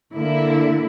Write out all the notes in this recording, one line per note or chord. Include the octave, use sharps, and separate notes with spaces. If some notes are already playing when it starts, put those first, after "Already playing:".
D3 A#3 E4